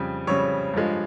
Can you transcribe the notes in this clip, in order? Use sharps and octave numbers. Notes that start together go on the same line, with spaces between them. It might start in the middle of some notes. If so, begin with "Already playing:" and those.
Already playing: F2 C#3 G3
F2 C#3 G3 C#5
G2 F3 G#3